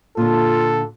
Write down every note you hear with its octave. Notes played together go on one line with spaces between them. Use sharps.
A#2 D3 F4 A4